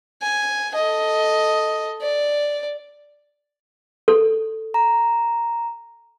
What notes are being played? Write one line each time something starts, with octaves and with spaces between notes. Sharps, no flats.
G#5
A4 D#5
D5
A4
A#5